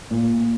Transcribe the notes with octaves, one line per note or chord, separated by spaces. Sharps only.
A#2